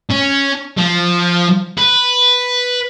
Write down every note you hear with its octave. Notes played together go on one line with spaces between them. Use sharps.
C#4
F3
B4